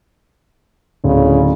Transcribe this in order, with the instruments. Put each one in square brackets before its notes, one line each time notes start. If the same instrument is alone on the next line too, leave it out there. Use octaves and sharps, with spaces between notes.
[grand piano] D1 [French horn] C#3